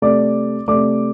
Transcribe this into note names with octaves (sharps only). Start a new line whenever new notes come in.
C3 A3 D5 D6
C3 A3 D5 D6